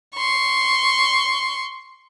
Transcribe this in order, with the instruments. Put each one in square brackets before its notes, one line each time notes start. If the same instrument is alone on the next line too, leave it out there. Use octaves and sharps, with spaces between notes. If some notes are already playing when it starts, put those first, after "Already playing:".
[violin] C6 C#6